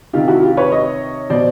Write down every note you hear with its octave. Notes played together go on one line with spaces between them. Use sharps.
C3 D#3 F4 G4
E4 F#4
F4 G4
B4 C#5
C#5 D#5
B2 C5 D5